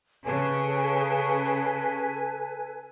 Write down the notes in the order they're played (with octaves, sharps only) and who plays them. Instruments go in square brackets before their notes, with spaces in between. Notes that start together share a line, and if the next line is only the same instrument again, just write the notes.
[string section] C#3 [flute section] A4 B4 G#5